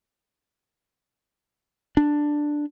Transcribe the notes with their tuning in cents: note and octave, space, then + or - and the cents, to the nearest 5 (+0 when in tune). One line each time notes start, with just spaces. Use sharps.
D4 +5